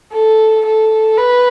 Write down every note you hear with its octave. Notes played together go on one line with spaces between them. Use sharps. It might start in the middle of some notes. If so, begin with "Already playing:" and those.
A4
A4
B4